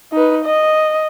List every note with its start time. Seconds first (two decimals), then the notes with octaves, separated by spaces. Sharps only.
0.13 D#4 B4
0.45 D#5